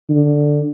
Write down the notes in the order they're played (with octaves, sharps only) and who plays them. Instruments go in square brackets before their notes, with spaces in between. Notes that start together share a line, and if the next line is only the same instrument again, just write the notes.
[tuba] D3